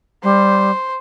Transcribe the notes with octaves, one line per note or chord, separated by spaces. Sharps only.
G3 C5